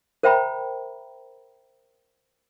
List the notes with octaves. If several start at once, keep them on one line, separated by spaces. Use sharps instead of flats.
A#4 C5 E5 G5 A#5 B5